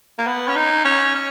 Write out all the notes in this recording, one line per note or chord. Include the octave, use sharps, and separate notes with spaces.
A#3
B3
C#4
D#4
C#4
C#4